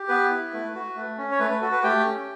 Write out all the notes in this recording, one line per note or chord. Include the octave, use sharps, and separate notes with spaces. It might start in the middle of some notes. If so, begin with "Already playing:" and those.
Already playing: G4
B3 B4
E4
A3
F#4
A3
C#4
C#5
A3 B4
B4
F#4 A4
B4
A3 G4 G5
C#4